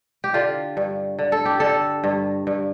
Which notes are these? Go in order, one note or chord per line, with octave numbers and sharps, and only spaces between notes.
G4
D3 F4
G2
D3
A4
G4
D3 A4
G2
G2